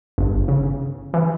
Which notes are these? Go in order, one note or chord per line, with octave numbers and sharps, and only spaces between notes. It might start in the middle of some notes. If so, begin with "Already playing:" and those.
G1
C#3
E3